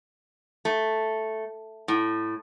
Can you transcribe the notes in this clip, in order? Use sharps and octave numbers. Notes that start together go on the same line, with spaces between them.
A3
A2